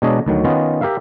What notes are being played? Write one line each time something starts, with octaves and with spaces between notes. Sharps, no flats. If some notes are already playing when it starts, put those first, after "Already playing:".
B2 G#3 D4 C#5 D#5 A#5
D2 D#3 F#3
D#3 B3 C#4 F4 D#5
G4 A#4 E5 F5